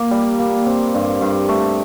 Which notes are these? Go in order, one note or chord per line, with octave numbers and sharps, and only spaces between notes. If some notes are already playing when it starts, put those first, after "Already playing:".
Already playing: A#3
G3
A#3
C4
G2
G2
A3